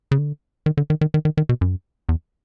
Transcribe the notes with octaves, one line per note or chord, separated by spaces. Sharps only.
C#3
D3
D#3
D3
D#3
D#3
D#3
D#3
D#3
B2
F#2
E2